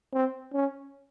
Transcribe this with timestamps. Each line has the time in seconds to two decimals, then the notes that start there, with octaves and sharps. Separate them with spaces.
0.13 C4
0.54 C#4